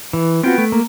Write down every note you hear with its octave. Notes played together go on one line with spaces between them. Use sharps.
E3
B3 C4 F4 F#4 G5
A3
A#3